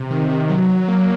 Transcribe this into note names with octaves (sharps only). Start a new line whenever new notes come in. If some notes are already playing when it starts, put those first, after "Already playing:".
Already playing: C3
D#3
C3
F#3
F#3
A#3